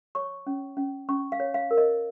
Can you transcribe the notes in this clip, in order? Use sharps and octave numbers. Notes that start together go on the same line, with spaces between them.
C#5 C#6
C#4
C#4
C#4 C#6
F5
C#5
F5
A#4
D#5